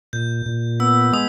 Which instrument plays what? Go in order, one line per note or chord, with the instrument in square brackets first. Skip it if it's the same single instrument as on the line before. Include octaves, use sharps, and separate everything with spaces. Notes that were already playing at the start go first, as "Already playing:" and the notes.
[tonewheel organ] A#2 [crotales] G6
[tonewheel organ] A#2
[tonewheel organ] B3 [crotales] E6
[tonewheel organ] G#3 [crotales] D#6